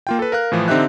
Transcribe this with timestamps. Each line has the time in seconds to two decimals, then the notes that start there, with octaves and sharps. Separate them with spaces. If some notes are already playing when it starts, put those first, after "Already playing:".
0.07 A#3 F4 G5
0.19 A4 B4
0.32 A#4 F5 F#6
0.52 A2 E3 F3
0.68 D3 C4 D#4 G4 E5 F#6